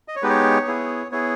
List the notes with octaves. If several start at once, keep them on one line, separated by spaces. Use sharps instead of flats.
D#5
C#5
G#3 B3 D#4 G4 B4
C#5
B3 E4 G#4
B3 E4 G#4 C#5